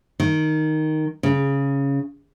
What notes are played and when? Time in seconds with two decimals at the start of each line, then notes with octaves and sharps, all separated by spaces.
0.20 D#3
1.23 C#3